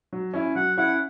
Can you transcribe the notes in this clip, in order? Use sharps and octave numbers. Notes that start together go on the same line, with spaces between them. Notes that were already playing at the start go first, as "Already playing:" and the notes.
F#3
C#4 E4
F#3 F#5
C#4 E4 F#5